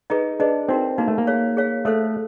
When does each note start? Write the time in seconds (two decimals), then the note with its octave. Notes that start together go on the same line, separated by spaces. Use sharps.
0.10 D#4 G#4 B4 D#5
0.40 D4 G#4 B4 D#5
0.69 C4 D#4 F#4 A#4
0.98 A#3 D#4 F#4 A#4
1.08 A3
1.18 A#3
1.27 G#4 C#5 F5
1.57 G#4 C#5 F5
1.85 A3 A4 C5 F5